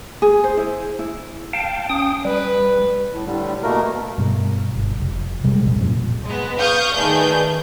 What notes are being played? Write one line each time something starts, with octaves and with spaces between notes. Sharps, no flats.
G#4
C5
E4
E4
F5 G5 A5
C#4 G5 D#6
G3 B4
A2
A2 D3 G3
B2 A3 A#3 A#4
G2 B2
G1
F1
C3 G3 G#3
D#1 A#1 F2
F#2 A#2
G#3 B3
F5 C#6 D#6 F6 G6
D#3 A3 G#4 B4 D5 G6